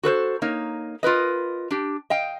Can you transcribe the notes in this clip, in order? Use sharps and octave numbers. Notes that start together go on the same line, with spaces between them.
F#4 A4 B4 C5
A#3 D#4 C#5
F4 A#4 B4 D#5
D4 G4
D#5 F5 G5